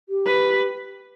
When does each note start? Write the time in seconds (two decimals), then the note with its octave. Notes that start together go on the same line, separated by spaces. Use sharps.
0.09 G4
0.26 B4